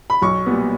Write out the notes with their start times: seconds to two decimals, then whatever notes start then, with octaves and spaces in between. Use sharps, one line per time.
0.10 B5
0.22 B1 C#6
0.46 A#2 G3 B3